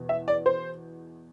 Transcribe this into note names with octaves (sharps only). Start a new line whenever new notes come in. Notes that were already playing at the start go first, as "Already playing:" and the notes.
Already playing: E2 B2
E5
D5
C5